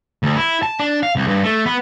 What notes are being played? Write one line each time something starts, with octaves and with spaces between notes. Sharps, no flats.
D2
E4
A5
D4
F5
C2
G2
A3
B3